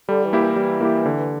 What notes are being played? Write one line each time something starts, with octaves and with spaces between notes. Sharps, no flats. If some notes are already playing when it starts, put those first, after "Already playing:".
D3 G3
E3
A#3 E4 G4
E3
G3
A#3 E4 G4
D3